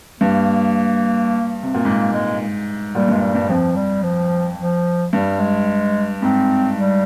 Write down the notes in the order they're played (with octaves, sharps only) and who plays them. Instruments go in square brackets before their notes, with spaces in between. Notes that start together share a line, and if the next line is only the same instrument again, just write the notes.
[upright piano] G2 [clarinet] A#3
[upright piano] C3
A#2
[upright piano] G#2 [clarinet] A#3
[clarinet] G#3
[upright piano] A#2 [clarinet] G3
[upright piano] G2 [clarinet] G#3
[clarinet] G3
[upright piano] G2
[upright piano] F2 [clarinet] F3
[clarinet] G3
F3
F3
[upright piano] G2 [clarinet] G3
[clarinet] G#3
[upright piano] G#2 [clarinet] C4
[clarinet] G3